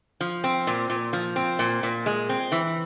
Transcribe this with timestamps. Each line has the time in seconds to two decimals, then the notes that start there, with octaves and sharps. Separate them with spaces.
0.21 F3
0.44 C4
0.67 A#2
0.90 A#2
1.13 F3
1.36 C4
1.59 A#2
1.83 A#2
2.06 G#3
2.29 C4
2.52 E3